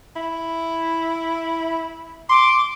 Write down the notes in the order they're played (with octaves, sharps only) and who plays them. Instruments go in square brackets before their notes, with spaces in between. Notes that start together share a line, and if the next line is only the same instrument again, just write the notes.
[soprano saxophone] E4
[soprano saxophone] C6 [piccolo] D6